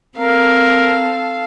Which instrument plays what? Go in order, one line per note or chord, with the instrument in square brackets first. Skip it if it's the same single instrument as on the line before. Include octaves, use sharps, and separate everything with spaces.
[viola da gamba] C4 [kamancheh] A4 F5 [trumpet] A#4